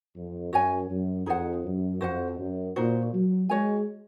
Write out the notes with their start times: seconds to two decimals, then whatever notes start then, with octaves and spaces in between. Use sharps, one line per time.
0.15 F2
0.52 F#2 F#4 C#5 G#5
0.89 F#2
1.26 F2 D#4 G#4 C5 F#5
1.64 F#2
2.01 F2 F#4 C5 F#5
2.38 F#2
2.76 A#2 D#4 F#4 C5
3.13 F#3
3.49 G#3 F#4 C#5 G#5